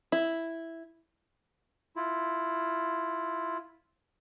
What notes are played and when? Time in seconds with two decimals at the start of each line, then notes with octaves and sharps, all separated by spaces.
0.12 E4
1.96 E4 F4